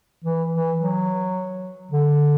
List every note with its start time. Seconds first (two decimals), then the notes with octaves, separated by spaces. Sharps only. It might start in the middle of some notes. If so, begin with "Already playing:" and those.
0.24 E3
0.52 E3
0.80 F#3
1.91 D3